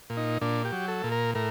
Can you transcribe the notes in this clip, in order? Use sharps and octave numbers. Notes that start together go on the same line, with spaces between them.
A#2
D#4
A#2 D4
G4
F#3
A4
A#2
A#4
A2 A#4